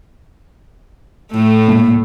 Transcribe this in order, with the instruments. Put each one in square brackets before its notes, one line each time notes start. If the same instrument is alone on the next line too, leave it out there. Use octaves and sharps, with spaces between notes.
[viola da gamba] A2 A3
[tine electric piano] A#2 G#3 A#3